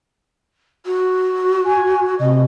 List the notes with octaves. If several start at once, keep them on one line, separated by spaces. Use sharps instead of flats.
F#4
G#5
C3 D#5